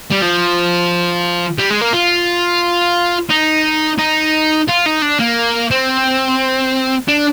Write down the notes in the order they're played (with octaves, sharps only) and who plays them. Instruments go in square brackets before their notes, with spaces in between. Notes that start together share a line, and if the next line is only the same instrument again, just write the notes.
[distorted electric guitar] G3
F3
G3
G#3
A#3
F4
D#4
D#4
F4
D#4
D4
A#3
C4
D4